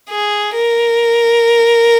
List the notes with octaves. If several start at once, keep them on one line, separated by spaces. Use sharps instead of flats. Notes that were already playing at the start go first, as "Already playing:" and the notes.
G#4
A#4